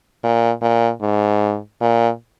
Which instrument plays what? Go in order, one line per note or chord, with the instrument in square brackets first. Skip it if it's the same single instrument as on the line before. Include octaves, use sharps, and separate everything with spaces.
[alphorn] A#2
A#2
G#2
A#2